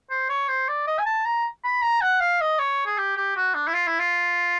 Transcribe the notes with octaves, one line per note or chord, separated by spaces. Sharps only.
C5
C#5
C5
D5
D#5
G#5
A5
A#5
B5
A#5
F#5
F5
D#5
C#5
G#4
G4
G4
F#4
D4
E4
F4
E4
F4